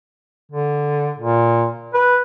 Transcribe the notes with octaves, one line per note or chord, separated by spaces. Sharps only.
D3
A#2
B4